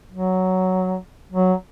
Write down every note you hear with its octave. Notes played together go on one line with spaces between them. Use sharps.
F#3
F#3